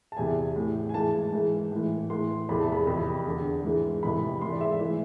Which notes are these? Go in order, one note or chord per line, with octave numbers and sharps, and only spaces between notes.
A5
E2 C3 E3 G#5
A2 E3
G#5
G#2 E3 A5
G#2 E3
A2 E3
A2 E3 C6
E2 C3 E3 B5
A5
B5
F2 C3 E3
E2 D3
G#2 E3
F2 C3 E3 B5
G#2 E3 C6
D5
E5
A2 E3